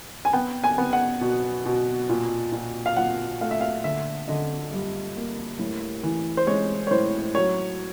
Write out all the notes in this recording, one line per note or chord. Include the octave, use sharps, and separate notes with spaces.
G#5
B3 G5
G#5
B3
F#5
B2
B2
A#2
A#2
F5
A#2 F#5
A3 F5
E5
F5
D3 E5
D3 D#5
G2
A#3
A2
E3
C5
G#3 C#5
C#5
A2 C5
F#3 C#5